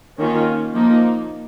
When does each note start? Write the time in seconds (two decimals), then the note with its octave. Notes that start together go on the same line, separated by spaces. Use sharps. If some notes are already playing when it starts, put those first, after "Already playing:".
0.18 D#3 A#3 C#4 F4
0.73 F3 A#3 D#4